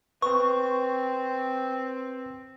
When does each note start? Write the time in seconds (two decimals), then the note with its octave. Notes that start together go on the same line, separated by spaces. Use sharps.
0.22 C4 B4 C#6